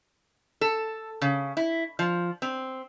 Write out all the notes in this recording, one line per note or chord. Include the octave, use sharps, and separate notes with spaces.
A4
C#3
E4
F3
C4